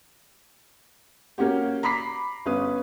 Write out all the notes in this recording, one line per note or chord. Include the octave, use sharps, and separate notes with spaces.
A#3 C#4 F#4 G4
A#5 B5 D6 B6 C7
G1 C#4 B4 D#6